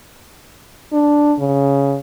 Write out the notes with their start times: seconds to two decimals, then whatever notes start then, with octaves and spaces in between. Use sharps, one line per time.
0.93 D4
1.39 C#3